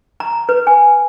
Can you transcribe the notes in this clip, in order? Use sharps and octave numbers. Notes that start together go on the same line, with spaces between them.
A#5
B4
G#5